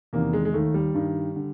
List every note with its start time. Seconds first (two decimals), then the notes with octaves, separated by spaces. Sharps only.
0.13 E2 C3 D#3 A#3
0.33 G#3
0.45 G#3
0.53 D#2 D#3 A3
0.74 G3
0.94 G2 D#3
1.36 D3